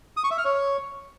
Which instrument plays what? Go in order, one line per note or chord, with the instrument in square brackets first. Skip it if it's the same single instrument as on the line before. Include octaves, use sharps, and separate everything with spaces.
[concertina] D#6
C#6
E5
F6
C#5